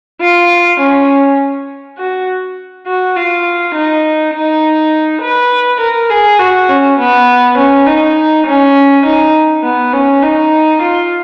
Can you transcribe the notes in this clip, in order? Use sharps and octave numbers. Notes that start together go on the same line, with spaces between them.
F4
C#4
F#4
F#4
F4
D#4
D#4
B4
A#4
G#4
F#4
C#4
B3
C#4
D#4
C#4
D#4
B3
C#4
D#4
F4